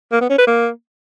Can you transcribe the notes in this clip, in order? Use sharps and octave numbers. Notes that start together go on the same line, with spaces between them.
A#3
B3
C#4
B4
A#3